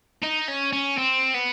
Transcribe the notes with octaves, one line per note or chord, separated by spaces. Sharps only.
D#4
C#4
C#4
C4
B3